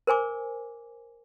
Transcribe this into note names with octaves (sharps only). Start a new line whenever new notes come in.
A#4 C5 G#5 D6